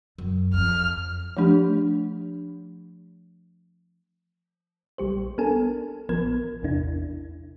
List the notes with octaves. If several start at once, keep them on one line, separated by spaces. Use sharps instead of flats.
F#2
F2 F6
F3 A3 D4 G4
A#1 G3 G4 C5
B3 D4 A4 A#4 G#5 A5
A#1 F3 B3 A#4 G#6
A1 E2 C3 D4 E4